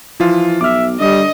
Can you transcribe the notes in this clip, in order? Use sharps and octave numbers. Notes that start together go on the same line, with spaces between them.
E3 F3 F4
B1 E5 D6 F6
D3 G3 D#5